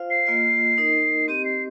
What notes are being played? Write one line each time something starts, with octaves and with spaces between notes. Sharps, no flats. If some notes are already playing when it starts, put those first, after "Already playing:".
Already playing: F4 C5 F5
C7
A#3 F4 D#5
D#4 A#4 D#5
C4 G4 D#5 D#7
C7